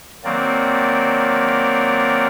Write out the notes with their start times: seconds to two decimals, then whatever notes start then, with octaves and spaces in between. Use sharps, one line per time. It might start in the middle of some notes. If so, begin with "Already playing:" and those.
0.24 D#3 F#3 A#3 C4 A#4 D5